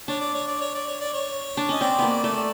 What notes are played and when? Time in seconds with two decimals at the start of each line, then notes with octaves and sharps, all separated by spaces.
0.08 D4 C#5
0.21 D5
0.34 C#5
0.48 D5
0.61 C#5
0.75 D5
0.88 C#5
1.01 D5
1.13 C#5
1.57 D4
1.69 C#4 D#5
1.81 C4 D5
1.99 A#3 B3
2.24 A3 D5